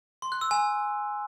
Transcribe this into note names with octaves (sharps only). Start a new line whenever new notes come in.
C6
F#6
E6
G#5